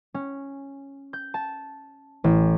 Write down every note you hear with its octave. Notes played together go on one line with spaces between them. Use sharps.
C#4
G6
A5
A1